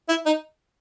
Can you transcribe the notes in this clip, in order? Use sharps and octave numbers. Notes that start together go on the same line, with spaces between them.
E4
D#4